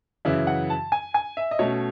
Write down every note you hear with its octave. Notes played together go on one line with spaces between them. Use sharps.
F#2 C#3 E3 E5
F#5
A5
G#5
G#5
E5
D#5
B2 A3 C#4 C#5